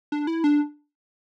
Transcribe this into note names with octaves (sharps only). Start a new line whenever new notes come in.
D4
E4
D4